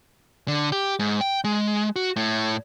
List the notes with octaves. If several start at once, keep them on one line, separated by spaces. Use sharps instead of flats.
D3
G4
G#2
G5
G#3
F#4
A2